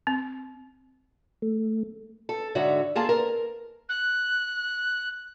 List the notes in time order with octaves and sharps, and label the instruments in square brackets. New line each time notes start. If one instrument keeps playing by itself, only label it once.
[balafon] C4
[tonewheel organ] A3
[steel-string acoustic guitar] A4
G#2 D3 F#4 C#5 E5
A#3 F4 G#4 A4 A5
A#4
[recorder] F#6